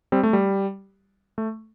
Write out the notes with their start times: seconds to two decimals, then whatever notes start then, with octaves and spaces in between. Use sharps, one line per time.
0.12 G3 C4
0.23 A3
0.33 G3
1.38 A3